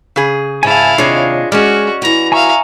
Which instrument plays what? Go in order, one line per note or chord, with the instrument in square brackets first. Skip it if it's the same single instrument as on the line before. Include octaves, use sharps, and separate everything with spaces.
[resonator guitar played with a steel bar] C#3 G#4
[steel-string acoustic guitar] G#2 [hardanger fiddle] E4 F5 [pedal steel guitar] G#5 A5
[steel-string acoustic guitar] D#2 C3 [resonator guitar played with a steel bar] D4 G#4 [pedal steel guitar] F4 C#5 D#5
[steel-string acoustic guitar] G#3 [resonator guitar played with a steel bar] C#4 D5 [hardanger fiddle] F#4 [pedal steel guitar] F6
[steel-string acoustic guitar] E3 F#4 [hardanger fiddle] A#5
[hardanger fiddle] E5 F5 [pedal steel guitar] G#5 A#5 C#6